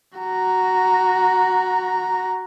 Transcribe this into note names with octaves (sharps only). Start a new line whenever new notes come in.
F#4 A#5